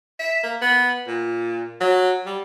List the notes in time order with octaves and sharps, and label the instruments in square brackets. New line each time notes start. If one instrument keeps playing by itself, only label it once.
[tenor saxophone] E5
A#3
B3
A#2
F#3
G3